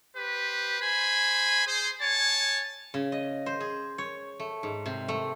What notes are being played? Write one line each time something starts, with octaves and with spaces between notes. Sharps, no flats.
G4 B4 C5
C5 G#5 B5
G#4 C5
C#5 G#5 A5
C#3
D#5
C5
G#4
C#5
A3
G#2
C3
A3